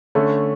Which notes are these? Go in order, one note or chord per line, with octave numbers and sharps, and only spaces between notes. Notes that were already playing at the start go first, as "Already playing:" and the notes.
D3 A3 C#4